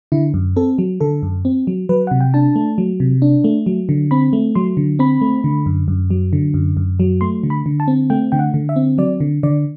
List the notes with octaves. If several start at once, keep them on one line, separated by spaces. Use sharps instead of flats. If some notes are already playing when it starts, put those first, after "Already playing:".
D3 E4
F#2
C4 A4
F#3
D3 A4
F#2
C4
F#3
F#3 B4
C3 F#5
G5
D4 A5
A3
F#3
C3
D4
A3
F#3
D3
C4 B5
A3
F#3 C6
D3
C4 B5
A3
D3
F#2
F#2
F#3
D3
F#2
F#2
F#3
A3 C6
D3
B5
D3
A5
C4
A3 G5
D3 G5
F#5
D3
E5
C4
F#3 D5
D3
D3 D5